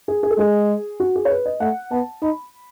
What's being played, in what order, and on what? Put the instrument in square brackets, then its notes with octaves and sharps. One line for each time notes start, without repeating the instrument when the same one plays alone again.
[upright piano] G#4
G#4
A4
[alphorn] G#3 [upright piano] G#4
[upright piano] F#4
G#4
C#5
B4
D#5
[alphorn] A3 [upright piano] F#5
[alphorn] B3 [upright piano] A5
[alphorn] D#4 [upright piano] B5